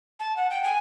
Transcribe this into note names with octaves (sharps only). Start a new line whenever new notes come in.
A5
F#5
G5
G#5